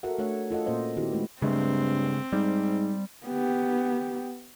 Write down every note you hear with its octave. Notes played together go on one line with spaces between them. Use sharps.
F#4 A4 A#4 E5 F#5
A3 D4 C#5 F#5
F4 A4 D#5 F#5
A#2 A#3 C#4 C5 D#5
D#3 F#3 C4 E4 F#4 G4
G#3 A3 E4 B4
G2 C#3 G#3 A3 C4
G#2 G3
B3 G4